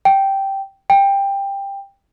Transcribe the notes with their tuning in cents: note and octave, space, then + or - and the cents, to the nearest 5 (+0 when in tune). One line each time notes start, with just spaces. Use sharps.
G5 -5
G5 +15